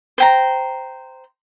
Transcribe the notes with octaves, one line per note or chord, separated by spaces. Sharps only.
C5 G5 A#5